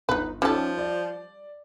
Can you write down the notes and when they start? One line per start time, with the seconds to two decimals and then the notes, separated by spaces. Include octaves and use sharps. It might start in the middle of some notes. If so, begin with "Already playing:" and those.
0.09 G1 D#4 B4
0.42 F3 G3 C#4 D#4 G4 A4
0.78 D5